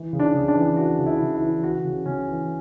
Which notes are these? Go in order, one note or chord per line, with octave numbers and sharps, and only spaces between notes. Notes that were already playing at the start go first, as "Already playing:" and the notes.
Already playing: E3
C#3
D4
C#3
D4
E3
E3 F#4
C#3
E4
C#3
E4
E3
E3 F#4
C#3
C#3 C#4
E3